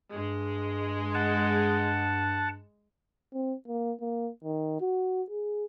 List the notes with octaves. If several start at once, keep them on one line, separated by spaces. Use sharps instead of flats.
G2 G#3
F#5 A5
C4
A#3
A#3
D#3
F#4
G#4